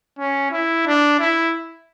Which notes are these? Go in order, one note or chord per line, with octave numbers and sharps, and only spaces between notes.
C#4
E4
D4
E4